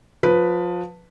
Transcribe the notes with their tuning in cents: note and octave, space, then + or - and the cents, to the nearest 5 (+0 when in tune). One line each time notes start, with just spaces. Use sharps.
F3 +25 B4 +0